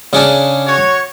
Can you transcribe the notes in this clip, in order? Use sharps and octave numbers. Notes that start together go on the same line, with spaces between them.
C#3 C#4 D4
F#4 C#5